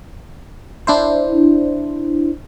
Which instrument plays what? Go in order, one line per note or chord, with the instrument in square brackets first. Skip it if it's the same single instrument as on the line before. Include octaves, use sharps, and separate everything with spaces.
[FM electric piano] D4 E4 C5